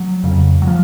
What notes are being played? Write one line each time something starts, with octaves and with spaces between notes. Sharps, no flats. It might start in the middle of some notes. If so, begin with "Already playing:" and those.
Already playing: F#3
F2 C#3
F#3
F3